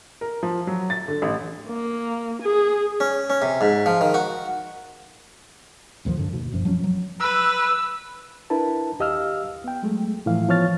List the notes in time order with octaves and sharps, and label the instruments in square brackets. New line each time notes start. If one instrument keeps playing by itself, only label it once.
[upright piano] A#4
F3
F#3
A6
D3
A1
[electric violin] A#3
G#4
[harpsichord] C#4
C#4
C3
G#2
F3
D#3
F#4
[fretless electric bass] A1 D#2 D#3 F3
G2 D3
D#2 B2
F#1 F#2 F3
F3 F#3 A3 C#4
F#3
[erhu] B4 [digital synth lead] E6
[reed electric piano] D4 E4 A#4 B4 A5
D#2 G4 D#5 F5 E6 F6
B3 G5
F#3 G#3 A3
A2 E3 F3 F5
E3 F3 B3 C#5 F6 A6